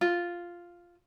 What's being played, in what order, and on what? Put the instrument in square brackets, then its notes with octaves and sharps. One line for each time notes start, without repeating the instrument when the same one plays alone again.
[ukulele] F4